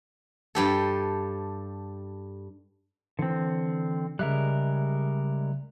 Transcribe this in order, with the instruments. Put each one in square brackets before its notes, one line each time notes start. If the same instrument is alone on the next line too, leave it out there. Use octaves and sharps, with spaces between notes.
[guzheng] G2 G4 A4
[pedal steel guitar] D3 C4 [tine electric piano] E3
[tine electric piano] C#3 E5 F#6 [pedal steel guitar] G3 G#3 A#4